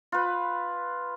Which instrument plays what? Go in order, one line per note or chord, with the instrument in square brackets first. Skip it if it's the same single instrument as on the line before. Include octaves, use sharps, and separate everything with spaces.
[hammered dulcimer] F4 B4